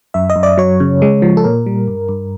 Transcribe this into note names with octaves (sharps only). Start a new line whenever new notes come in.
F#2 E5
D#5
F#2
D5
F#3 C#5
C#3
G#3
F3
A4
A#2 A#4
G3
G2
G2